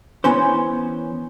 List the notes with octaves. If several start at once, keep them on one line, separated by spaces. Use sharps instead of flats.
E3 B3 C#4 C5